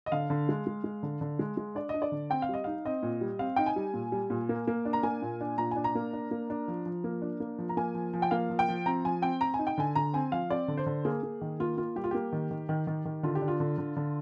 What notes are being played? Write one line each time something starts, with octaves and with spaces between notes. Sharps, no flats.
D#5
D3 F5
D3
G#3
G#3
G#3
D3
D3
G#3
G#3
D4 D5
D4 D#5
D5
D3
C4 G5
F5
G3 D#5
D#4 F5
C4 D#5
A#2
G3
C4 F5
D#4 G5
G#5
G3
A#2
G3
A#2
A#3
A#3
D4
A#5
A#3 G#5
A#2
D4
A#2 A#5
D4 G#5
A#5
A#3
D4
A#3
D4
F3
F3
A#3
D4
A#3
F3
A#5
A#3 G#5
F3
F3
G5
A#3 F5
F3
G5
F3
C4 A#5
F3 G#5
C4 G5
C4 A#5
G#5
D#4
G5
D3 G#5
D3 A#5
C4 G#5
F3 F5
C4 D5
D3
C5
D3
A#3 G#4
A#3
D#3
A#3 F4
A#3 F4
G3 G4
F4
A#3 G4
D#3
D#3
D#3
D#3
D#3
D3 F4
G4
D4
F4
D3
D3
D3